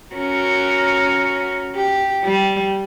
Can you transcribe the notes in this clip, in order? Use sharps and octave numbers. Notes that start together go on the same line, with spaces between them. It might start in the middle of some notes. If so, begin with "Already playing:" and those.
C#4 F#4 A#4
G4
G3